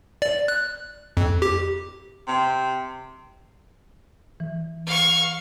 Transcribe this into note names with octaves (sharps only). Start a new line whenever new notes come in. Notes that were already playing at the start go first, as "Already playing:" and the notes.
D5
F#6
F2
G4
C3
E3
F5 C#6